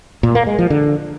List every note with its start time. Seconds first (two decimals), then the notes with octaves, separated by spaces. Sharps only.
0.23 A#2
0.35 A#3
0.47 G#3
0.59 F3
0.70 D3